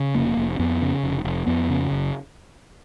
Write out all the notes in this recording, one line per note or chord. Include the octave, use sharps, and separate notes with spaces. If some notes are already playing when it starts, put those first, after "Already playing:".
Already playing: C#3
F1 A#3
F1
F2 B3
C#3
F1
F1
F2 B3
C#3
F#1